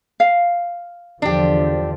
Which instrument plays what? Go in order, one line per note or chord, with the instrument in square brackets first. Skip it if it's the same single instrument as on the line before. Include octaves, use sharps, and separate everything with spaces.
[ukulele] F5
[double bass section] E2 D3 F3 [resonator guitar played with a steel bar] D4 G4